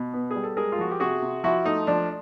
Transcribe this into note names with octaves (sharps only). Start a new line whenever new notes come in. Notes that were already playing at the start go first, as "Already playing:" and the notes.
Already playing: B2
B3
G3 G#4
A4
G#3 G#4 A#4
F4
F3 F#4
G4
C3 F#4 G#4
C3
F3 E4 F#4
A3 D#4
F3 D4